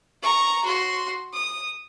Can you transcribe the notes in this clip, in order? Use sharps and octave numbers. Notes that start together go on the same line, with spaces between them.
A#5 C#6
F#4 C6
D#6